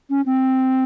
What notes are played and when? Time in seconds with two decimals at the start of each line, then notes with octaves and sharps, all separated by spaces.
0.10 C#4
0.26 C4